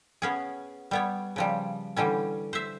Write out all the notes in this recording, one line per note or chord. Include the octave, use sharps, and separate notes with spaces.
B3 C#4 G#4
G3 B3 C#5
C#3 F3 G3
D3 E3 G3 C#4
C5 E5